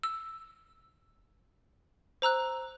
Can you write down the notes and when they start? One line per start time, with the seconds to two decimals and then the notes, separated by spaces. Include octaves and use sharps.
0.03 E6
2.22 C5 A#5 E6 F#6